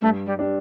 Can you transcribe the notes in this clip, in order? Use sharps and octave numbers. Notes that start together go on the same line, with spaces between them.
G2 A3
G3
G3 D4